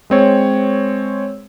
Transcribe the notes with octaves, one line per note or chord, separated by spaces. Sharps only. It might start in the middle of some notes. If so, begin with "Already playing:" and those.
G#3 C4 C#5